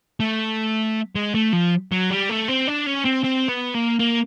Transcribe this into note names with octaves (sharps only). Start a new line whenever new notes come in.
A3
G#3
A3
F3
F#3
G3
A3
C4
D4
C#4
C4
C4
B3
A#3
A#3